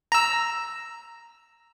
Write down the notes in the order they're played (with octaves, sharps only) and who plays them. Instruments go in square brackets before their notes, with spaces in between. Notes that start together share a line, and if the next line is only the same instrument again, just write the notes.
[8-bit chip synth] A#5 E6